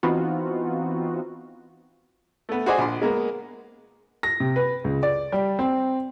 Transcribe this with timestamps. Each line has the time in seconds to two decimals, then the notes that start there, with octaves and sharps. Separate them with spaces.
0.03 E3 B3 C4 D#4 F4 F#4
2.49 A3 B3
2.66 F#4 G#4 C5 D5 D#5 G#5
2.78 A#1 C6
3.01 G#3 A#3 B3
4.23 A#6
4.40 C3
4.56 B4
4.84 C#2
5.03 D5
5.32 G3
5.59 C4